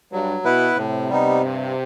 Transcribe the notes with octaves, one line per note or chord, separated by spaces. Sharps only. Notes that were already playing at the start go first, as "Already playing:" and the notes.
G2 F#3
B2 B3 E4 B4
A2 C3
G3 B3 D#4
G2